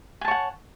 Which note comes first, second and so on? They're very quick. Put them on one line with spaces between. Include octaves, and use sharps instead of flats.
G#5 A5 C#5 F#5